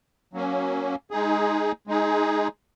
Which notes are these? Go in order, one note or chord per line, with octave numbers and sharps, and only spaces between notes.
F#3 A#3 C#4
G#3 D#4 G#4
G#3 D#4 G#4